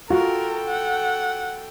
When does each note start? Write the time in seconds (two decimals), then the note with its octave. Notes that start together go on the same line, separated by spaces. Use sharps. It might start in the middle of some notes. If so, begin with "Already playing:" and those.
0.10 F4 F#4 A4 A#4 G5
0.67 F#5